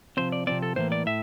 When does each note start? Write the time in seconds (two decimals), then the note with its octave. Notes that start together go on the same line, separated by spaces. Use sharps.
0.17 C3 F3 C4 C5
0.32 D5
0.47 C3 F3 C4 D5
0.62 A4
0.76 A2 E3 A#3 C5
0.92 D5
1.06 A2 E5